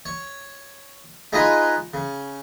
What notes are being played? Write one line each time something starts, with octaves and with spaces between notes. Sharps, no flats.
C#5
G#3 D#4 F4 G#4 B4 D#5
C#3